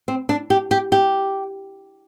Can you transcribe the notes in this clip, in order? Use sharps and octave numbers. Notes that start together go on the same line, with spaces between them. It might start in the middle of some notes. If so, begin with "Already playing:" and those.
C4
D4
G4
G4
G4